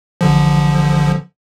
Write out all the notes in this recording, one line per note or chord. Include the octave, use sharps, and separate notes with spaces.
A1 D3 F3